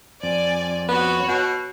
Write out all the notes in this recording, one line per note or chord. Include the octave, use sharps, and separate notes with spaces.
F2 D5 G#5
B3 F#4 C#5
B2